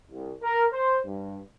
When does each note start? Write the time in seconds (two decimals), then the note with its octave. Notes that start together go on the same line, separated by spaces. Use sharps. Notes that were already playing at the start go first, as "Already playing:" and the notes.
0.11 C2
0.43 A#4
0.72 C5
1.06 G2